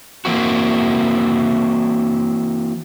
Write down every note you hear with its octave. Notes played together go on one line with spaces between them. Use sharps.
E3 A#3 C4 F#4